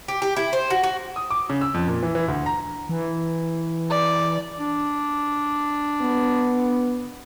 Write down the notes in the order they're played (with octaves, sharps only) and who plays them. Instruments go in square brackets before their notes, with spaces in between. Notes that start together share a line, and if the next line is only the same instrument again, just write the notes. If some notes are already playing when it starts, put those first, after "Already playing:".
[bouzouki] G4
G4
E4
C5
F#4
F#4
[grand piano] D#6
D6
C#3
E6
F2
A#2
E3
E3
D2
A#5
[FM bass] E3
[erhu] D5
[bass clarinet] D4
[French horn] B3